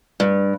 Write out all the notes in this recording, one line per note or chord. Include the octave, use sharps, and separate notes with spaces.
G2